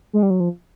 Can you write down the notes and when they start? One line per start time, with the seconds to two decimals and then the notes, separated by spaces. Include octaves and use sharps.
0.13 G#3
0.23 G3
0.30 F#3
0.40 F3